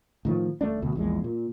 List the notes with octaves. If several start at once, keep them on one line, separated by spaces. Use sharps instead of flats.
A2 D#3 F3
D#1 A3 D4
D2 B2
A#1 E2 G#3
A#2